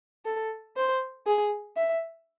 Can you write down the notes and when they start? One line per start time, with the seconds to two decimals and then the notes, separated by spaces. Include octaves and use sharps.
0.25 A4
0.76 C5
1.26 G#4
1.77 E5